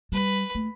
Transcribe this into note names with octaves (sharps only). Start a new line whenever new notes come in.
G3 B4
A3